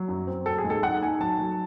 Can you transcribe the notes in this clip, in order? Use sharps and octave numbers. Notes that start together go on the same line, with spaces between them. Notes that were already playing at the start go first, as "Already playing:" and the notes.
Already playing: F#3
F#2
C4
F#3 A4
G#4
G#2
A4
D#4 F#5
D#4 G#5
F#3 A5
F#3